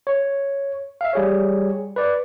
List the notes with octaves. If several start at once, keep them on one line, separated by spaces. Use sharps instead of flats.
C#5
E5 F5
G3 G#4 C#5
B4 D5